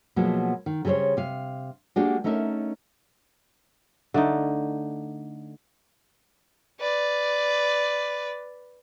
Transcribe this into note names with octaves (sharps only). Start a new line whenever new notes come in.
B2 F3 F#3 G#3 A#3 B3
D#3
C#3 G3 A4 C5 C#5
C3 F5
G#3 A#3 D4 F#4 G4
A3 C#4 D#4 A#4 E5
D3 A3 D#4
B4 D5